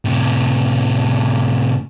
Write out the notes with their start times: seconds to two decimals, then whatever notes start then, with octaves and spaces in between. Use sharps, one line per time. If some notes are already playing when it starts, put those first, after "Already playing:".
0.05 A2 C3